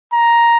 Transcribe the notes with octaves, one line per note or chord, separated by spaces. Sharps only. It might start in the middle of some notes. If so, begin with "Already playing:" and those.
A#5